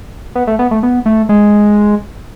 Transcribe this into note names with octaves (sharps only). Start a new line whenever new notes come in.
B3
A3
B3
A3
B3
A3
G#3